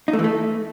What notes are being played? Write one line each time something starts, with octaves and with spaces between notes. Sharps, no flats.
D#4
A3
E3
A3